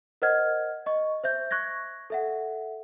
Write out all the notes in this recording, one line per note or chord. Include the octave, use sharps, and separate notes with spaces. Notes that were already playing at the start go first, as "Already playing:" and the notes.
A#4 C5 D#5 F#5 F6 G#6
D#5 C#6
C5 E5 G6
C#6 F#6 G#6 A#6
A4 E5 F#5